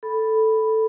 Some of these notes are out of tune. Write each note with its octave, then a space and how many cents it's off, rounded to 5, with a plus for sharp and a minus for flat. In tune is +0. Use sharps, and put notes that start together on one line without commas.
A4 +0 B5 +0